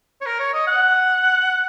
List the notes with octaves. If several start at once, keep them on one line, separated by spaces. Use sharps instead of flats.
C#5
A#4
C#5
D#5
F#5